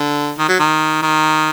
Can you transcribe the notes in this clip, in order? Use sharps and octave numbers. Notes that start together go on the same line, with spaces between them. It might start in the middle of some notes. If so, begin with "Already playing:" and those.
Already playing: D3
D#3
F#3
D#3
D#3